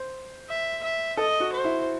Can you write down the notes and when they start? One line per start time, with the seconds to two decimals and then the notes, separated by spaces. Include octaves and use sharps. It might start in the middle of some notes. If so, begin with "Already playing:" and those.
Already playing: C5
0.49 E5
0.84 E5
1.17 A4 D#5
1.40 F#4
1.53 C5
1.64 E4